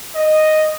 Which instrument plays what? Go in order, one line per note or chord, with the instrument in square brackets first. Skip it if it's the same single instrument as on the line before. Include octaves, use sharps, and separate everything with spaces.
[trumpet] D#5